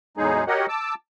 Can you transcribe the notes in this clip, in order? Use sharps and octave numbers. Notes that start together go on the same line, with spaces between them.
E2 A2 F#3 G#3 D#4 G#4
F#4 G4 A#4 C#5 D#5 F#5
A5 D6 E6